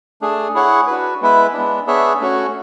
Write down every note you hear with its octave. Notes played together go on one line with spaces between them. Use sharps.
A3 D4 G#4
E4 G#4 C#5 F#5
D4 F#4 B4
G#3 B3 E4 B4 E5
G#3 B3 D4
B3 D4 G#4 C#5 E5
A3 C#4 F#4 C#5